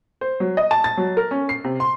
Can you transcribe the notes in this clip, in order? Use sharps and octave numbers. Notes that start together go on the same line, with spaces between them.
C5
F#3
D#5
A5
A6
F#3
A#4
C#4
C7
C3
C6